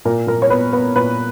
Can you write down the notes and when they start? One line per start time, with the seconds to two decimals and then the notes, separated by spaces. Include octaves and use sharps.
0.05 A#2 A#4
0.27 A#2 A#4
0.42 C#5
0.50 B3 B4
0.73 B3 B4
0.96 A#2 B4